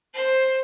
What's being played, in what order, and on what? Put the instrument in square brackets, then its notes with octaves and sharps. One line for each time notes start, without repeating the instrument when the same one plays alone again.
[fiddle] C5